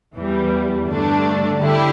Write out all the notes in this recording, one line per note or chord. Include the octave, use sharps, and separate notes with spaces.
E2 E3 G3
G2 D3 A3 D4
D3 G3 E4 G4